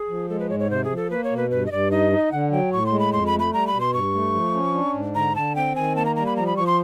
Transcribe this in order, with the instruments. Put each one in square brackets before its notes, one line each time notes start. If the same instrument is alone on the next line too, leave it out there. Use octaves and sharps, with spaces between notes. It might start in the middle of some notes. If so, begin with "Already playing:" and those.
Already playing: [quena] G#4
[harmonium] F3
[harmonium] G#3 [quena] A4
[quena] B4
[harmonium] G#2 [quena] C#5
[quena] C#5
[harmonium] C3 [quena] C5
[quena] G#4
[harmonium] F3
[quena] A4
[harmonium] A#3 [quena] B4
[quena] C#5
[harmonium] B2
[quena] B4
[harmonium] G2 [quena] B4
[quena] D#5
[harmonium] G2 [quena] D5
[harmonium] D#4 [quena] D#5
[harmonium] D#4
[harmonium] D3 [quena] F#5
[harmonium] F#3 [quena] G5
[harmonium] A2 [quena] C#6
[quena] C6
[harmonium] G#3
[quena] B5
[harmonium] F2 [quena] C6
[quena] B5
[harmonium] A3
[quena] B5
[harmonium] G3 [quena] A#5
[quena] B5
[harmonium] B2
[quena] C6
[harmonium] G2 [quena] C#6
[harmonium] A3
F3
C#4
D4
G#2
[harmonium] D3 [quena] A#5
[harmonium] D3 [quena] A5
[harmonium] C4 [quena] G5
[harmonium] D#3 [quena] G#5
[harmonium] A#3 [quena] A5
[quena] A#5
[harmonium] G3 [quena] A#5
[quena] B5
[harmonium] F3 [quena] A#5
[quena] B5
[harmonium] F3 [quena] C#6
[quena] C6